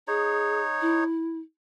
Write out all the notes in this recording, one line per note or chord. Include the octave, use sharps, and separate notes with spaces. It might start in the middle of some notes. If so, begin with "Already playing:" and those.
D#4 G#4 C#5
E4